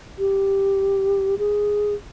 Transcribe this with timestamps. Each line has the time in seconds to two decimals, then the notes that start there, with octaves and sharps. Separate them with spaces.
0.19 G4
1.39 G#4